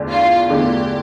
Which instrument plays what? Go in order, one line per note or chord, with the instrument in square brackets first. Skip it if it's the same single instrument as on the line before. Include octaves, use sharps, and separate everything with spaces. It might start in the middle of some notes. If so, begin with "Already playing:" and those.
Already playing: [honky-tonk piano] E2 D3 A3 D4
[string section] F4
[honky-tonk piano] E2 D3 A3 D4 [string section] G4